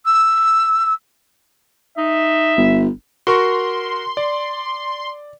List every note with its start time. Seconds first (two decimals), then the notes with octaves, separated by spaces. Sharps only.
0.05 E6
1.98 D#4 E5
2.57 G1
3.27 F#4 A#4 C6 C#6
4.17 D5